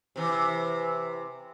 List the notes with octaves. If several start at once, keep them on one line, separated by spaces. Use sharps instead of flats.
C3 E3